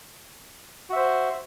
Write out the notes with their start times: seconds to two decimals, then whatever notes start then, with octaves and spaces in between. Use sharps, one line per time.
0.90 F#4
0.93 E5
0.96 C5